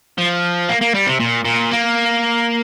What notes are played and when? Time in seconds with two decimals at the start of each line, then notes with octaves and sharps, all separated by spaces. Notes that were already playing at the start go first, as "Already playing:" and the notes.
0.18 F3
0.69 A#3
0.82 A#3
0.95 G3
1.07 C3
1.20 A#2
1.44 A#2
1.71 A#3